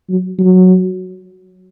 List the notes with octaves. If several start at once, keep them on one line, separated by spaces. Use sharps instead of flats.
F#3
F#3